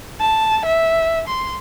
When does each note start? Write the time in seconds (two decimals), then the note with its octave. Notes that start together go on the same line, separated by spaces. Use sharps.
0.20 A5
0.65 E5
1.28 C6